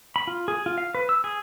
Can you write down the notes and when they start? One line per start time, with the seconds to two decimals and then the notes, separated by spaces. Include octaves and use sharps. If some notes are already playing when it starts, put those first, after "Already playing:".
0.16 B5
0.27 F4
0.48 G#4
0.66 F4
0.78 F5
0.95 B4
1.09 E6
1.24 G#4